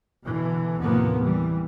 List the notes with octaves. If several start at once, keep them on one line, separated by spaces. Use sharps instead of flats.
B2 D3 E3
D#2 A2 C3 F3 A#3 B3
E3 G3